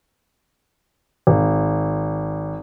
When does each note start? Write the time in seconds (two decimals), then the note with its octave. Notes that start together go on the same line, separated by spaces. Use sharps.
1.27 G#1